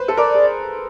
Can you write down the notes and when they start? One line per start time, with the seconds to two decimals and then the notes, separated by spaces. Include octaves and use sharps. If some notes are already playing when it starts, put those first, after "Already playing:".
Already playing: B4 C5
0.08 A4
0.17 A#4 D5
0.35 G#4